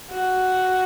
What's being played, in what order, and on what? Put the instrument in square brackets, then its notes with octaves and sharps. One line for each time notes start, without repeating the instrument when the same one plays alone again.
[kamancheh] F#4